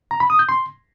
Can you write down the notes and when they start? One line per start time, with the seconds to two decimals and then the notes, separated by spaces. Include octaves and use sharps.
0.11 A#5
0.20 B5
0.30 D#6
0.39 G6
0.49 C6